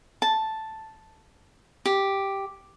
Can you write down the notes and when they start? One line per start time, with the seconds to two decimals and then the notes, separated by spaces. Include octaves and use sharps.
0.22 A5
1.86 G4